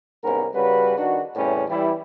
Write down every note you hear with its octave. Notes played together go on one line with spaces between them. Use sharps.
C2 G#2 B3 C#4 A#4
C#3 G3 C#4 F#4 B4
D#3 D4 D#4 F#4
E2 A2 C3 G3 B3 C#4
E3 G3 E4